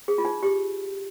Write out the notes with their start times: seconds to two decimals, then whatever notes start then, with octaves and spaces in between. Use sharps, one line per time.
0.08 G#4
0.18 F4
0.25 D#4
0.43 G4